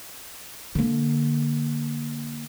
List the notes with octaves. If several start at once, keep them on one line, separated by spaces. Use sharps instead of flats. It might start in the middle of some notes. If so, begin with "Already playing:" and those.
D3 A#3